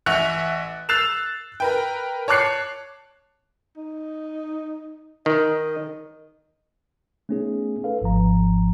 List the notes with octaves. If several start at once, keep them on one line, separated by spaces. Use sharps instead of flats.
A1 E5 F#5 C#6 F#6 F7
E6 F#6 A6 C7 E7 F7
A#4 B4 G5
C#5 A5 D6 F#6 C7 C#7
D#4
D#3 D#5
A3 B3 C#4 D#4 G#4
A4 B4 F5
G#1 G#2 F3 A#5